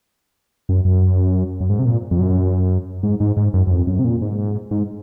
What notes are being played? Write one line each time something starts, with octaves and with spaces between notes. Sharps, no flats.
F#2
F#2
F#2
G#2
C3
A#2
F2
F#2
G#2
G#2
G#2
F#2
F#2
F2
F#2
C3
A#2
G#2
G#2